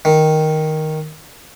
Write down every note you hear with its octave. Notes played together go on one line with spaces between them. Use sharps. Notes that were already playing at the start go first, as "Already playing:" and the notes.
D#3